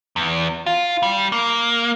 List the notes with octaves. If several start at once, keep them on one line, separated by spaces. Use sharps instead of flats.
E2
F4
G3
A#3